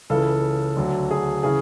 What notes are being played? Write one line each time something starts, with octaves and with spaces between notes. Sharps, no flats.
C#2 C#3 E3 A4
D2 D3 F#3
G#4
C#3 E3 G#4